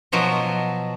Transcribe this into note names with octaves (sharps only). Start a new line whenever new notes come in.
B2 F3 F#3 D#5